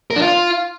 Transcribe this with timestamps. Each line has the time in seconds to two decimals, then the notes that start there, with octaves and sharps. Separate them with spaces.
0.11 A#4
0.16 D4
0.22 F4